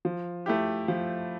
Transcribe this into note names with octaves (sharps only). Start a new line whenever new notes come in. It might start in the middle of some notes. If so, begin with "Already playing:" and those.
F3
A3 E4 G4
F3